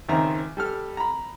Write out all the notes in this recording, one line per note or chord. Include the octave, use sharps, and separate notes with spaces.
C#2 D#3 C4 E5 A#5
G3 A4 F6
A#5 B5